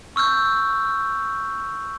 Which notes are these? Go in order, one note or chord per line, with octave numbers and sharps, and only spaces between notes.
C#6 E6 F6 G6